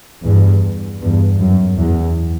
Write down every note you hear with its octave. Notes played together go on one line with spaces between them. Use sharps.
E2 G2
E2 G2
F#2
E2